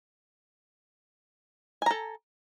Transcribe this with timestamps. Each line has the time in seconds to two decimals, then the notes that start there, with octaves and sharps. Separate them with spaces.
1.82 G#5
1.86 A#5
1.91 A4